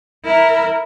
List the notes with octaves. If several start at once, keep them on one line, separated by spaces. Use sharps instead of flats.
E4 A#4